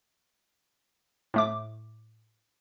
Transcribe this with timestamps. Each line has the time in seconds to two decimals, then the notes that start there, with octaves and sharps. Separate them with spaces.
1.34 A2 A3 D6